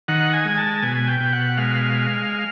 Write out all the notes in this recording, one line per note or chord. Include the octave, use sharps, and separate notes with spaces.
D#3 F#5
G#5
G#3
A5
B2 G#5
G5
B2
F#5
G#3 F5